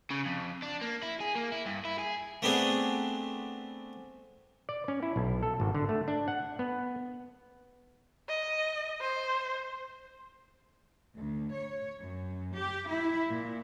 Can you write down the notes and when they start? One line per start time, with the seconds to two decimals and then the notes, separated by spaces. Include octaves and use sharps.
0.10 C#3
0.25 F2
0.62 D4
0.81 A#3
1.03 E4
1.20 G#4
1.35 A#3
1.52 E4
1.66 G2
1.85 E4
1.99 G#4
2.42 A3 B3 C4 D4 G#4
4.69 D5
4.88 C#4
5.03 E4
5.16 B1
5.43 A4
5.60 G#1
5.75 D3
5.89 A3
6.08 D4
6.28 F#5
6.59 B3
8.28 D#5
9.01 C5
11.17 D2
11.55 C#5
12.00 F#2
12.54 G4
12.89 E4
13.31 A#2